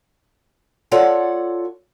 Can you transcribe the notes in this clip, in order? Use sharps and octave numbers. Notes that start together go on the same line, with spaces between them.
F4 A4 C#5 D5 F#5